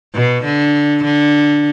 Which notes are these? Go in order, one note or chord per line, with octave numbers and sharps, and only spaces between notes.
B2
D3
D3